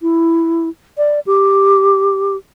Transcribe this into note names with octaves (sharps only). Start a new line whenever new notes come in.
E4
D5
G4